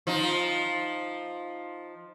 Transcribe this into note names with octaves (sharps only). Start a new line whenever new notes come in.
F3 D#4